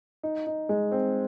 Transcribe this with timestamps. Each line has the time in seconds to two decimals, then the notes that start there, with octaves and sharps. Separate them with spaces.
0.23 D#4
0.47 D#4
0.69 G#3
0.92 C4